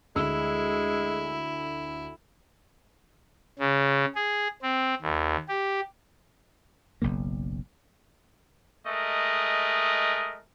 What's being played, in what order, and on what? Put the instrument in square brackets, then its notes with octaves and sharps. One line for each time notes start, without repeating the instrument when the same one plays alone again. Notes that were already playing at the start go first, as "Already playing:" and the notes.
[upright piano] D2 E6 [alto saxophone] G#3 [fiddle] E4
[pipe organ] C#3
G#4
C4
D#2
G4
[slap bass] F#1 B1 C#3 A#3
[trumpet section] G#3 A3 A#4 D#5